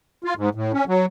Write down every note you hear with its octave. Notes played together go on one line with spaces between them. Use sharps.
F4
G#2
A2
C#4
F#3